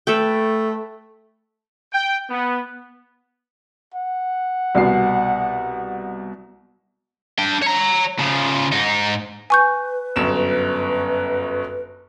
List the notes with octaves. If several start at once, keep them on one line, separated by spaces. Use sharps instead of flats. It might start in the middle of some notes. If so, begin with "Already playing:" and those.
A3 A4 B4 G5
G5
B3
F#5
C2 B2 C7
D4 G5
C#5 A#5
C#3 F3
G#2 D#4
B4 G#5 C#6 G6
G1 F#2 E7